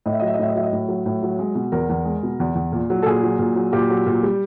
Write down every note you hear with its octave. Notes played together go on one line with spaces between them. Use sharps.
A2 D#5
E5
F#3 D#5
E5
D#5
A2 E5
D#5
F#3 E5
D#5
A2
F#3
A2
F#3
G#3
B2
E2 A#4
E2
G#3
B2
E2
E2
A#2
F#3
A4
A#2 G#4
F#3
A#2
F#3
A#2 G4
F#3
A#2
G3